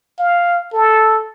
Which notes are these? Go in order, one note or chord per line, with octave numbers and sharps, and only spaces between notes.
F5
A4